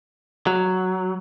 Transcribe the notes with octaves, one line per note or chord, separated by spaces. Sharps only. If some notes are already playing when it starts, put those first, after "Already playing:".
F#3